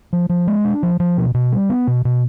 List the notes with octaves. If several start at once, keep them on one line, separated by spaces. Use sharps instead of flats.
F3
F3
G#3
D4
F3
F3
B2
B2
G3
B3
B2
B2